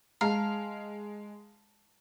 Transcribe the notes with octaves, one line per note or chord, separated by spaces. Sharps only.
G#3 F5 A5 A#5